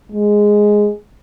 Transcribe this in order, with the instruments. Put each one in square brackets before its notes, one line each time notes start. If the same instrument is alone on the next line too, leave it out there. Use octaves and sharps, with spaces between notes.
[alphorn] G#3